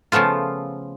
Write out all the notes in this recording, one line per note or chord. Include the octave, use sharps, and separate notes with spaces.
C#3 F3 A3 B3 F4